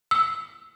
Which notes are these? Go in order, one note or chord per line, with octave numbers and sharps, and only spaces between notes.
E6